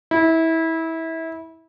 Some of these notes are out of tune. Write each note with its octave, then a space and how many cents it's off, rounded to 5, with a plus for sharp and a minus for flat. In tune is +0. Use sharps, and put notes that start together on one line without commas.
E4 -25